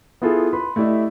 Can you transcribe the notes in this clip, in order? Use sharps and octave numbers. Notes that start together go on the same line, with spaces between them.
B3 E4 F4 G#4 A4
B4 B5 C6
A3 E4 G4 D5 D#5